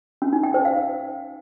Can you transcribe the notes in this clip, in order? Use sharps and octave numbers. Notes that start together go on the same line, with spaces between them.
C#4
D#4
G5
C5
F5